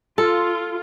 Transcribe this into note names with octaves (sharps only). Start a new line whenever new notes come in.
F4 A4